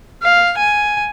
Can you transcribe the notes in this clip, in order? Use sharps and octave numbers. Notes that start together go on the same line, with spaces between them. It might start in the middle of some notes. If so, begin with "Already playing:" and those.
F5
G#5